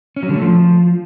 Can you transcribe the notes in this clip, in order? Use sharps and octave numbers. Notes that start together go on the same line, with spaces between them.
C#4
F#3
D3
A3
F3